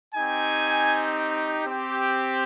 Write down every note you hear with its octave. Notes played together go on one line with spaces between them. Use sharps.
C4 D#4 G4 G#5
C4 G4